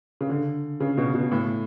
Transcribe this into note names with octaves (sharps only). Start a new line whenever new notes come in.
C#3
D3
C#3
B2
B2
A2